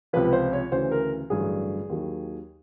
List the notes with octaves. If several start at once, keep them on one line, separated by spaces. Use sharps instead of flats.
C#2 C3 F3 B4
C5
C#5
D2 C#3 E3 C5
A#4
A1 G2 D3 F#3 G#4
D#2 D#3 F#3